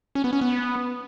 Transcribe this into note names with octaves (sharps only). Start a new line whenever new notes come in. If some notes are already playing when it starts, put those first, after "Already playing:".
C#4
B3
C#4
B3